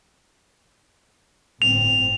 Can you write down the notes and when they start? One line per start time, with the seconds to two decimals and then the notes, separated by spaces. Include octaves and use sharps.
1.62 G1 A2 C4 F7